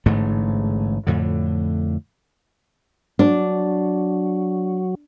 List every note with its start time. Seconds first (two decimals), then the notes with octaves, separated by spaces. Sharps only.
0.06 A1 G#2 D3 A3
1.07 F2 A2 D3
3.19 F#3 D4